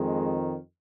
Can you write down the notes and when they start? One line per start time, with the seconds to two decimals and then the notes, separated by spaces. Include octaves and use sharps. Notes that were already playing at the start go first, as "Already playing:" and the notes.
Already playing: F2 D#3 G#3